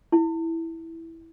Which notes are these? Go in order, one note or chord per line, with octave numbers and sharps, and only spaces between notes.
E4